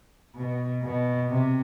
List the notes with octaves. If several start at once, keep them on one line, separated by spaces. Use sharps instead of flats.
B2
B2
C3